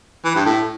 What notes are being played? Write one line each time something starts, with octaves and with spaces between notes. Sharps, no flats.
E3
G2
A2